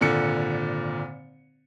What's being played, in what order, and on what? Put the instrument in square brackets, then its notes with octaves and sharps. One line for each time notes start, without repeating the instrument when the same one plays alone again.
[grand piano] G#1 A#2 D3 C#7